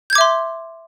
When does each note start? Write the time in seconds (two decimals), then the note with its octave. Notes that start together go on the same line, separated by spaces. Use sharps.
0.10 G6
0.13 G#6
0.15 D6
0.18 E5
0.21 C6